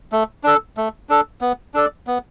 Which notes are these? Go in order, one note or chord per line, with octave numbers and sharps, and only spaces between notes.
A3
D4 A4
A3
D4 A4
B3
D4 A4 D5
B3